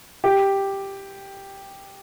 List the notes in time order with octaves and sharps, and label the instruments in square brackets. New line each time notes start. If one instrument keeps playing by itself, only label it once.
[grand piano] G4